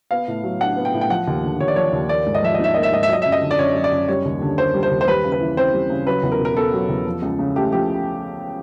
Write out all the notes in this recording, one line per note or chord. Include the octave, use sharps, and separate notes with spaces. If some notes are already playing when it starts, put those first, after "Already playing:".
B3 F5
A2
F#3
D4 F#5
B3
G5
A2
G5
F3 F#5
D#2
D3
D#2 C#5
D5
F3 C#5
D#2
A#3 D5
G#2
D#5
F3 E5
D#5
D#4 E5
A#3 D#5
E5
G#2 D#5
E5
F#3 D#5
F#2 E5
D#5
D3
D5
F#2 C#5
F#3
D5
F#2
G3 C#5
D#2
D3
A#3 C5
G3
C5
D#2
C5
G3 B4
C#3
B4
E3
C4 C5
G3
C#3
F#3 B4
E2
A#4
B2
A#4
B3 A4
F#3
E2
F3
C#2
C#3
A3 G4
F3 G4